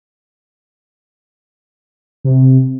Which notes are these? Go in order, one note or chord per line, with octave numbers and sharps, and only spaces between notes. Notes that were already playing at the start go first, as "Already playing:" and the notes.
C3